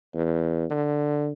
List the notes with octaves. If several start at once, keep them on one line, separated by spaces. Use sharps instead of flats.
E2
D3